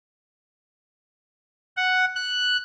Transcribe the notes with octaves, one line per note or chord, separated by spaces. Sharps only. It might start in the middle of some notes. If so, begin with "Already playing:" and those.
F#5
F#6